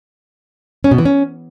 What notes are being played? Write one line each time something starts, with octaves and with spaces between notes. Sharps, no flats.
C#4
B2
E3
C#4